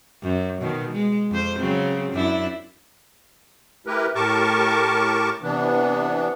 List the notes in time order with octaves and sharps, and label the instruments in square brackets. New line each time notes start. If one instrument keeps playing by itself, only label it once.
[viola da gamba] F#2
B2 D#3
G#3
F2 C5
C#3 F#3 C4
F#2 D4 E4
[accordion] A3 E4 G4 A#4 B4
A2 G4 A#4 A5 C#6 D6
C3 E3 B3 D4